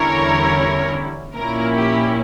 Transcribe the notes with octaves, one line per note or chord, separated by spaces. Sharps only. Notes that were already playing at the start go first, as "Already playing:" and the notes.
Already playing: E2 D3 G3 C#4 E4 A#4 C#5
A#1 A#2 A#3 C#4 E4 A#4
G4